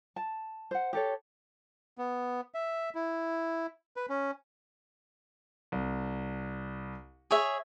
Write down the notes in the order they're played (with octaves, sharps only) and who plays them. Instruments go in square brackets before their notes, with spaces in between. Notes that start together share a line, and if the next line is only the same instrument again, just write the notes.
[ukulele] A5
C5 F#5
G4 A4 C#5
[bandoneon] B3
E5
E4
B4
C#4
[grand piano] C2
[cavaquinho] G#4 C#5 E5